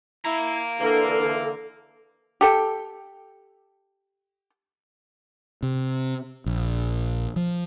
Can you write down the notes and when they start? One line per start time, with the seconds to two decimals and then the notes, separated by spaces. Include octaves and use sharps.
0.25 E4 F5 A#5
0.81 D3 E3 A#3 A4
2.41 G4 A4 G5
5.63 C3
6.46 A#1
7.36 F3